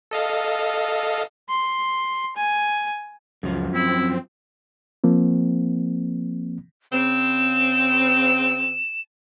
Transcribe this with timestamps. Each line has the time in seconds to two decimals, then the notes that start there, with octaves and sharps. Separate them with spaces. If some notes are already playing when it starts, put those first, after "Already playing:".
0.11 A4 D#5 F5
1.49 C6
2.36 G#5
3.43 C#2 F#2 F3
3.75 C4 E4
5.04 F3 A#3 C4
6.93 C#3 C4 E7